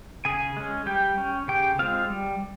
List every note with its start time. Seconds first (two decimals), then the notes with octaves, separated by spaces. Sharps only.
0.25 C#3 G#4 G#5
0.57 G#3 C#4
0.86 G3 G4 G5
1.17 C#4
1.48 C#3 G4 G5
1.79 G#3 C4 F4 F5
2.10 G3